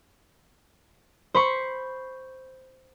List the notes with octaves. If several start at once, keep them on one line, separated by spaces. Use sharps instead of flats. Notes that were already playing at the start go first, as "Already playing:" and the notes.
C5 B5 C#6